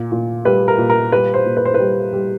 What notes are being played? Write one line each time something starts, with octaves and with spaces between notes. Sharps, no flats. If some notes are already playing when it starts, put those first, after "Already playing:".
Already playing: A#2
A#2
G3 B4
A#4
A#2
A#4
G3 B4
C5
A#2
B4
C5
G3 B4
G3